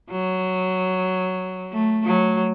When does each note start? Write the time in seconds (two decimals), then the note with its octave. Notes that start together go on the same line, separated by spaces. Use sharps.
0.11 F#3
1.72 A3
2.05 F#3